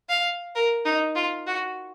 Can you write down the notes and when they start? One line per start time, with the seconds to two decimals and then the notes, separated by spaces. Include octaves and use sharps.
0.09 F5
0.55 A#4
0.85 D#4
1.15 F4
1.47 F#4